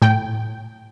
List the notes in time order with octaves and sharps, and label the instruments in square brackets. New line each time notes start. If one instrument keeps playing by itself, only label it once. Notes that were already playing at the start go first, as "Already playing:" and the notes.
[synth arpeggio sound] A2 G5